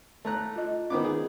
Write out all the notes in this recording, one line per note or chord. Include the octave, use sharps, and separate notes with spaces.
A3 A#5 F#6
F4 D#5
D#3 B3 C#4 F4 C5 D6
G#4